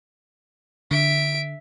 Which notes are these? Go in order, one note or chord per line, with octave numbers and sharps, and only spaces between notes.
D3 E5 D7